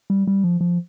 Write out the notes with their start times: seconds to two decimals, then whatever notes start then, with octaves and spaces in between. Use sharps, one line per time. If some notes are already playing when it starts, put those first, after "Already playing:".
0.10 G3
0.27 G3
0.44 F3
0.61 F3